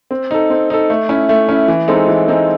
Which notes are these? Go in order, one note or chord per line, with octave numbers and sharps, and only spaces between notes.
C4
D#4 A4
C4
D#4 A4
A3
C#4 E4
A3
C#4 E4
E3
G#3 C4 D#4 A4
E3
G#3 C4 D#4 A4